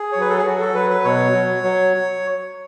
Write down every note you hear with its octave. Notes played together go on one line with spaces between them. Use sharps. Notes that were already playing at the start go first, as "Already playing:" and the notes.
Already playing: G#4
C#5
F#3 B4
A4
G#4
F#3 F#4
A4
F#3 B4
B4
B2 C#5
F#3
F#3